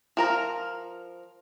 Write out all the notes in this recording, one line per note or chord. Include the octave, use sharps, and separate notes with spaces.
F3 A#4 A#5